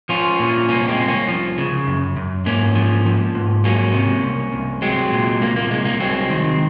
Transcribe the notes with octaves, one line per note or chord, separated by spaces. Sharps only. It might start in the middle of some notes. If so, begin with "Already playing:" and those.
F3 C#4 F4
A#2
C2 A#3 C#4
G#3 C4
C2
A#3 C#4
F3
C#3
F#2
F#2
G#2 A#3 C#4
F3
F3
G#2
F#3 A#3 C#4
C3
C2
C2
F#3 G#3 C4
A#2
C2 A#3
A#3
C2 G#3
A#3
F#3 G#3 C4
D#3